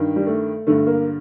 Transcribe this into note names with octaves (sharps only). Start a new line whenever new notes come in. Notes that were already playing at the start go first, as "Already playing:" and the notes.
Already playing: G2 D#3
G3
A3
G2 D3 A3
A#3